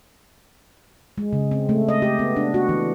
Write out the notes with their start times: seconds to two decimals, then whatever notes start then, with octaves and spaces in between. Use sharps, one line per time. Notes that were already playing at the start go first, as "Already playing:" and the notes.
1.18 G#3
1.33 C#3
1.51 C4
1.69 A3
1.88 D#5
2.02 G4
2.19 B3
2.36 D4
2.54 F#4
2.69 E3